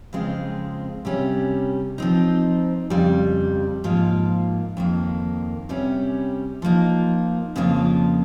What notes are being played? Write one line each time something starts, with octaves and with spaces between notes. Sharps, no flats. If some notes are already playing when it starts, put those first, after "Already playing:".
F2 C#3 G#3 C4 F4
C3 G3 C#4
F3 C4 D#4
F2 C#3 G3
G#2 F3 A#3 F4
F2 D#3 A#3
C3 G3 C#4
F3 A#3 D#4
F2 C#3 F3 A#3 F4